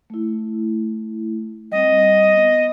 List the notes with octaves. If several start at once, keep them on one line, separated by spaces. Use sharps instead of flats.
A3 E4
G3 C4 D#5
B3